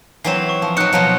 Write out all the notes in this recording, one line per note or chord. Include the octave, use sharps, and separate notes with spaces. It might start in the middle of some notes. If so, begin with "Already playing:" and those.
E3 F#3 C4 C7 E7
C#6
F3
F#3 D#4 F#6 C#7
B2 F3 F#3